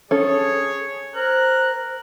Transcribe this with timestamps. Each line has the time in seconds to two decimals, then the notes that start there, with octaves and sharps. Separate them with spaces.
0.11 C#4 G#4 A4 C#5
1.15 A#4 C5 F#6